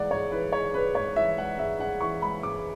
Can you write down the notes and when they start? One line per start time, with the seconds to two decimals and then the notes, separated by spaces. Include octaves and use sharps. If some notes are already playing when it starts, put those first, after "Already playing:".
Already playing: G#2 E3 G#3 D5 F#5
0.11 G#2 C#5
0.32 E3 B4
0.52 G#3 C#5
0.73 G#2 B4
0.95 G#2 C#5
1.16 E3 E5
1.38 G#3 F#5
1.58 G#2 E5
1.80 G#2 F#5
2.00 E3 C#6
2.22 G#3 B5
2.43 G#2 D6